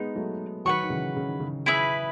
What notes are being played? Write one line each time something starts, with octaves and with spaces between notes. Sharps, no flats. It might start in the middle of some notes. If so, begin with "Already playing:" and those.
Already playing: G#3 B3 D#4
F#3 A3
D#3 F#3 B4 F#5 C#6
D#3
C#3 E3
C#3
D#3
C#3
E4 G#4 B4 E5